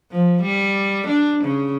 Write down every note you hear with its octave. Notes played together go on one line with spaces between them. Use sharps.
F3
G3
D4
C#3